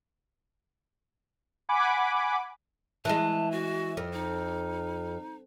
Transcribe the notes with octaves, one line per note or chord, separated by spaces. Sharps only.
F#5 G#5 B5 D6
E3 G#3 A5
F#4
F2
D#4